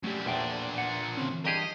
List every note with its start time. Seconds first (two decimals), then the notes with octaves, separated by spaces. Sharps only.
0.04 F#2 G3 A3 G4
0.26 E2 A#2 D4 C5 G5
0.78 F#5
1.17 D3 C4 C#4
1.31 E3
1.46 G2 G4 G#4 D#5